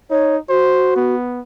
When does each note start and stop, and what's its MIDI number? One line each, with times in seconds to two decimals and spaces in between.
0.11 0.38 63
0.11 0.35 73
0.49 1.15 66
0.49 0.92 72
0.96 1.40 59